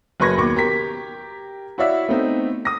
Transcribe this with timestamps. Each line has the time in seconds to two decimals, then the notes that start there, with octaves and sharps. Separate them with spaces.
0.20 F#1 F#3 B4 C#6 G#6 A#6
0.38 D#2 B2 C#6 D6
0.56 G4 A#4 A#5 B6
1.78 E4 F#4 C#5 D5 E5 F5
2.09 A3 B3 C4 D#4
2.65 D#6 A#6